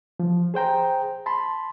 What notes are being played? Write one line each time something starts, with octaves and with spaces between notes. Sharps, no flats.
F3
G#4 C5 G5 A#5
A5 B5 C6